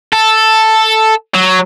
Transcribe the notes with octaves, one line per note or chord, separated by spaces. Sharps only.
A4
F#3